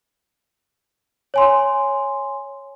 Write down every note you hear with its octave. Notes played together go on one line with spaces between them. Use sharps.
C#5 G#5 C6